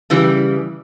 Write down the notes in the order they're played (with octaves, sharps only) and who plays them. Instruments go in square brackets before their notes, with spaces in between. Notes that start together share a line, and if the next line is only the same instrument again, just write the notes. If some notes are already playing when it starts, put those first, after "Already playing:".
[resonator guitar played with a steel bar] C#3 E3 G3